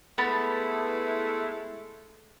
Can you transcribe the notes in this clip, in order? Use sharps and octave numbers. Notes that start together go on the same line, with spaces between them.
G#3 A3 B3 E4 A5 B5